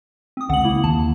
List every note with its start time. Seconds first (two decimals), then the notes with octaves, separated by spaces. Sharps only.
0.37 C4 D#6
0.49 C#2 F#5 F#7
0.64 A#3 E4
0.84 D#2 A5